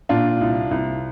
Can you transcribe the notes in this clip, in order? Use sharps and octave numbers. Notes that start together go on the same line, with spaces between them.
A#2 D4 F4
C2
C2